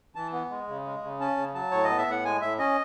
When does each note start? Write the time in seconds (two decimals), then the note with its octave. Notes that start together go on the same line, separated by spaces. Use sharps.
0.15 E3 A5
0.32 B3
0.50 G#3
0.68 C#3
0.85 G#3
1.03 C#3
1.20 C#4 A5
1.37 C#3
1.54 F#3 A5
1.71 A2 C#5
1.84 D#5
1.90 B3
1.98 E5
2.07 A2 F#5
2.25 G#3 G#5
2.41 A2 E5
2.59 C#4 D#5